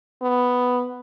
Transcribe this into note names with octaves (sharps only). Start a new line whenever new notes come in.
B3